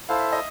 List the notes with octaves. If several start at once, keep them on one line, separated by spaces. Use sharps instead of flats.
E4 A4 C5 F5
E5
D#5